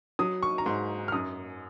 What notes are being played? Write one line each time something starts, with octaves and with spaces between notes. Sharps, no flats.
F#3 D#6
C#6
A#5
G#2 C6
F6
F#2 D#6